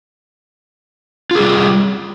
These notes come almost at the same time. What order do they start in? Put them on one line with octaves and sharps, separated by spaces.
F4 G#4 G3